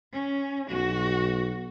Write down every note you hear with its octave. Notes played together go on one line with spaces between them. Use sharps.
C#4
B1 F#4